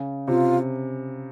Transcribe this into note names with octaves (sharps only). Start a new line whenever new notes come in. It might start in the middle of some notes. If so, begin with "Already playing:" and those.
Already playing: C#3
C3 F4